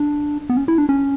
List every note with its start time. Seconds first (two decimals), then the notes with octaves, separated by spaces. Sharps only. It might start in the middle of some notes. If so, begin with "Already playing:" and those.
Already playing: D4
0.50 B3
0.57 C#4
0.68 E4
0.78 D4
0.89 C#4